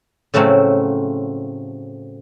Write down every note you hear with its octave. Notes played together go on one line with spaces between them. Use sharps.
A2 C#3 F3 F#3 A3 C4